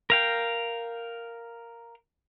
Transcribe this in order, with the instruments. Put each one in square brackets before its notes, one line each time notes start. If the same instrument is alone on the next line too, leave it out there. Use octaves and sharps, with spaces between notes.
[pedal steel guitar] A#4 F5 G5